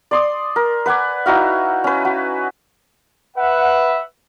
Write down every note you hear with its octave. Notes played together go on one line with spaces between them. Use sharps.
D5 C6 D#6
A#4
B4 F#5 G#5 D6
D#4 E4 F#4 F5
C#4 B4
F#4
B4 E5 F#5